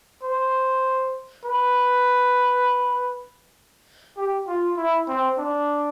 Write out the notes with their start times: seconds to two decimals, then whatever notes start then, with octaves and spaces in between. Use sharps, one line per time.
0.24 C5
1.45 B4
4.17 G4
4.48 F4
4.77 E4
5.08 C4
5.39 D4